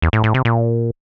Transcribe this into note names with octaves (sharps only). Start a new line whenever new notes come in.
E2
A2
A2
C3
A#2